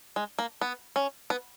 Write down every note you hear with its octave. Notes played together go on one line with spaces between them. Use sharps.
G#3
A#3
B3
C#4
B3